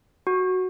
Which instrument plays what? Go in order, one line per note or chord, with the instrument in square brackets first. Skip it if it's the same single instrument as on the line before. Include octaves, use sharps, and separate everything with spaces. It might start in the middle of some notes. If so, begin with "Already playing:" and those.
[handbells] F#4